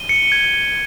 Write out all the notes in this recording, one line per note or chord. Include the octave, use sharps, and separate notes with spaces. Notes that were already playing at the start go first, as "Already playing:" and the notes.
Already playing: D#7 G7
C#7
G#6